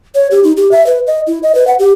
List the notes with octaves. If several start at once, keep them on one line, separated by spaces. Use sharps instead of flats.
C#5
G4
D#4
G4
E5
B4
D#5
E4
D#5
B4
F#5
G4